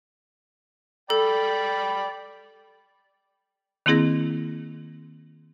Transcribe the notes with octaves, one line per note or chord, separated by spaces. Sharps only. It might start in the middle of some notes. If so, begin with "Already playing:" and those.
A4 D5 G5 B5
D#3 A#3 C4 E4 G#4 A#6